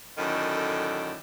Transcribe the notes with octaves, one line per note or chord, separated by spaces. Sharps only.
F#2 A2 D3 D#3